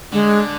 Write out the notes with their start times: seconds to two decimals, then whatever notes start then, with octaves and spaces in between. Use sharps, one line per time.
0.12 D3 G#3